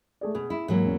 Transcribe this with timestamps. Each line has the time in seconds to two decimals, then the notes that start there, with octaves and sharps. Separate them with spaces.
0.21 A3 G#4 D5
0.35 B2 G#4
0.50 E4
0.68 G#2 E3 F#3 A#3
0.84 E1 B1 C#4